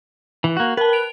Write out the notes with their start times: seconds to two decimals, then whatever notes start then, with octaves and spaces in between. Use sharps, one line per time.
0.44 E3
0.57 A#3 F#4
0.77 A#4 B4 A5
0.93 D7 F7